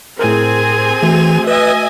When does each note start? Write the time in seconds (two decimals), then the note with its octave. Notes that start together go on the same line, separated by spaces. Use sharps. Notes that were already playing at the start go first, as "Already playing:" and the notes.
0.19 A2 C4 G#4 A#4 G#5
1.03 E3 A3 F#4
1.47 B4 D#5 E5 G#5